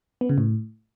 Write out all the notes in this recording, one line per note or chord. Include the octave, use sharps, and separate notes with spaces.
B3
C#3
A2